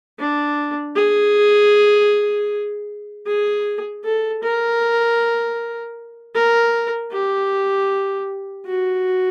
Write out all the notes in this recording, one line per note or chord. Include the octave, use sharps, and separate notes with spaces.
D4
G#4
G#4
A4
A#4
A#4
G4
F#4